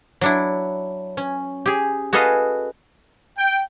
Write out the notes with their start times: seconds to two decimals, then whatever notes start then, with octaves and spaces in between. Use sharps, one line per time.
0.21 F#3 D4 E4
1.17 C#4
1.66 G4 G#4
2.13 F#4 G#4 A4 B4 D#5 F5
3.38 G5